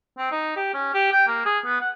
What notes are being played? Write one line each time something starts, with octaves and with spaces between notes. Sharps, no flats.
C4
D#4
G4
C#4
G4
G5
A#3
G#4
B3
F#5